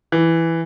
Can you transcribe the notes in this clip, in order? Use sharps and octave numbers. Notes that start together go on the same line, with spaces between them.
E3